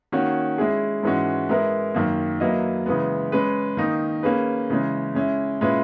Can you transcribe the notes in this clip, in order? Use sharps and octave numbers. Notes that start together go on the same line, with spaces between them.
D#3 A#3 C#4 F#4 C#5
G#3 C#4 E4 G#4
G#2 E3 G#3 C#4 F#4
G#3 B3 E4 A#4
F#2 D#3 A#3
F#3 A#3 E4 B4 D#5
C#3 E3 G#3 B3
G#3 C#4 G#4 B4
D#3 A#3 D#4
A#3 C#4 G#4 B4
C#3 E3 G#3 C#4
G#3 C#4 E4
A#2 G#3 C#4 E4 B4